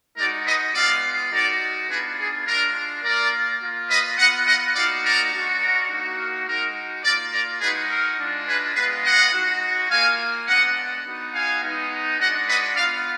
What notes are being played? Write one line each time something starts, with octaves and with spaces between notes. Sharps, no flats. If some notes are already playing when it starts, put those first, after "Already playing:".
G#3 D#4 F#4 A#4 D5
B4 D#5
G#3 B3 F4 D5 F5
G#3 D#4 F#4 A#4 D5
B3 D4 F4 G#4 B4
G#4
G#3 D4 F4 A#4
A#3 F4 A#4 D5
A#3 F4
B4 D#5
B3 F4 D#5 F#5
D#5 F#5
A#3 D#4 F#4 D5 F5
A#4 D5
G#3 D4 F#4
A#4
A#3 D#4 F#4
A#4
G#3 D#4 F#4 A#4
A#3 F4 A#4 D5
A#4 D5
G#3 D#4 F#4 G#4 B4
A#4
G#3 D4 F4
G#4 B4
G#3 B3 F4 G#4 B4
D#5 F#5
G#3 D#4 F#4
A#3 F4 F5 G#5
G#3 B3 D4 D#5 F#5
B3 D#4 F#4
F5 G#5
G#3 B3 D#4
G#3 D4 F#4 D#5 F#5
B4 D#5
B3 F4 D5 F5